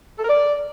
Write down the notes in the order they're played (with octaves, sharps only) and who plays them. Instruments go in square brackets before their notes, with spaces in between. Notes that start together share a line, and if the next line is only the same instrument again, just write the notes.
[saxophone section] A4
A#4
D5